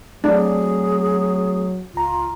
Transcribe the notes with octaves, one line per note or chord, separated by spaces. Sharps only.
F#3 A3 C4 D4 G#4
C#2 F4 A#5